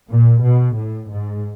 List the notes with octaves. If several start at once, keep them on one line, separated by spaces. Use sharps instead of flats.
A#2
B2
A2
G#2